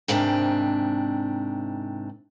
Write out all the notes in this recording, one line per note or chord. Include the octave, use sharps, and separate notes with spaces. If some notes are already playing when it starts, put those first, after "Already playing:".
G#2 C3 D#3 D4